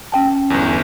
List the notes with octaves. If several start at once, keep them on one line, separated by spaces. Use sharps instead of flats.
C#4 G5 A5
G1 E2